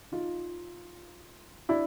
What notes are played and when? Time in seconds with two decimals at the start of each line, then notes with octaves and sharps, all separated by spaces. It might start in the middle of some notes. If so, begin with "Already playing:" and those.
0.12 D#4 F4
1.69 D4 E4